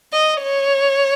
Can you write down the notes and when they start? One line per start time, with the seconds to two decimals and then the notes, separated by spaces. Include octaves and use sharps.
0.13 D#5
0.42 C#5